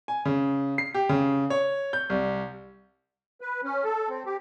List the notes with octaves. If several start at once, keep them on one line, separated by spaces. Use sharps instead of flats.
G#5
C#3
C7
G4
C#3
C#5
G6
C2
B4
C#4
A4
C4
G4